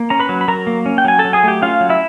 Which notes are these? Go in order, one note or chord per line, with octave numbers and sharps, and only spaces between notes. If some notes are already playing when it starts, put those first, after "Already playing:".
Already playing: A#3
C#4 A#5
B4 B5
F#3
B5
F#3 A#4 A#5
A#3
C#4
G5
F#3 G#5
A4 A5
F#3
G#4 G#5
A3 G4 G5
C#4 F4 F5
F#3
E4 E5